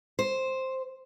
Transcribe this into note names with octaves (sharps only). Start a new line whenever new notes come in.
C5